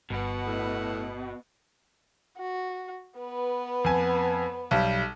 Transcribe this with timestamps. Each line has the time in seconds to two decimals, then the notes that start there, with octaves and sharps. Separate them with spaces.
0.10 G1 B2 B4 F#5
0.46 A2
2.38 F#4
3.20 B3 B4
3.84 F2 G#5
4.71 B1 G3